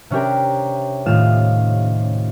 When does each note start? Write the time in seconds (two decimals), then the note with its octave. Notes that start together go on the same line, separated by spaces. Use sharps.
0.10 C3 C#4 D4 G4 A#4
1.06 D#1 A2 F4 F6 E7